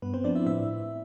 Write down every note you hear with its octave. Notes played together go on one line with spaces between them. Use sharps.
G2 B3 B4
C4 C5
F3 B3 D4 D5
E4 E5
A2 E4 E5